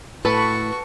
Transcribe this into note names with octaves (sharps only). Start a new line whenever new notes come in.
A2 F#4 A4 B4 A5 B5 C#6